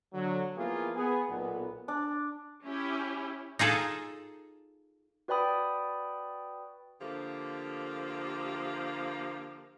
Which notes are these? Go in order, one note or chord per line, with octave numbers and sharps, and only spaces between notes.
D3 F#3
F3 A#3 B3 E4 F4 G#4
B3 G#4
B1 A#2 B3
D4
C#4 E4 G4
D#4 F4 G#4 A4
F#4 B4 D5 G5 B5 D#6
D3 F3 A3 A#3 G4